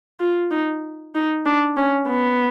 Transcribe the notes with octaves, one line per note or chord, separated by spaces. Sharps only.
F4
D#4
D#4
D4
C#4
B3